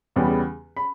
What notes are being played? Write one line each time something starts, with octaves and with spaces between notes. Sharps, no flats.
E2 C#3 G3 B3
B5